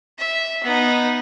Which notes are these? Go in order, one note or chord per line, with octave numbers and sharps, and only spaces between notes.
E5
B3 D#4